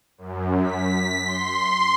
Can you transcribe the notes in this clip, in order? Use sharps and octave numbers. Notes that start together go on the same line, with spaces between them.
F#2
B6
C6